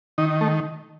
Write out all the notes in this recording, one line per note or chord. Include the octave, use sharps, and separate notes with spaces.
D#3 D#4
A3